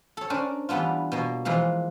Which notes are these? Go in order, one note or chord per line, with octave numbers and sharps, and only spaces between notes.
A4 C#5
C#4 D4 A#4 C5
E3 G3 B3 D4 F4
B2 A#3
E3 F3 G#3 A#3